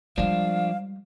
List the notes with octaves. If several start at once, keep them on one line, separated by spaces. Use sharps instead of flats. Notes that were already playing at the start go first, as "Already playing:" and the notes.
F3 G3 G#3 D4 F5